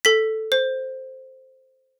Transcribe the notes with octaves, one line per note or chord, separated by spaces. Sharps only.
A4 B6
C5